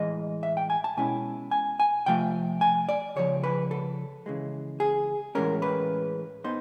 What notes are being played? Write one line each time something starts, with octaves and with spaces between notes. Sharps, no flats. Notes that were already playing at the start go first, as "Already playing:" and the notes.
Already playing: A2 E3 G#3 D#5
E5
G5
G#5
A5
B2 G#3 C#4 E4 G#5
G#5
G#5
C3 F3 A3 G5
G#5
D5
C#2 C#3 F3 C#5
B4
A4
C#3 E3 G#3
G#4
A2 E3 G#3 C#4 A#4
B4
B3 D#4 C5